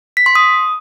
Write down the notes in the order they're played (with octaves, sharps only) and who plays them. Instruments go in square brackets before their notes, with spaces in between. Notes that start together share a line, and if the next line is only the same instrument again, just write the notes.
[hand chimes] B6
C6
D#6